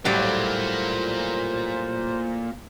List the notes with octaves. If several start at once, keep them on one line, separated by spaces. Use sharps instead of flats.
A2 F#3 G3 A#3 F4 C5